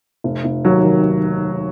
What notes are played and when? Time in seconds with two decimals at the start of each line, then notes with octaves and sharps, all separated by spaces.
0.24 F1
0.44 F1
0.65 D#2 F#3
0.84 D#3